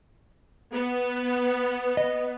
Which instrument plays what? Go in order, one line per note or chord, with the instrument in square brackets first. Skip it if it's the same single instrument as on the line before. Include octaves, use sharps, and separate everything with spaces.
[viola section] B3
[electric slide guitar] D#5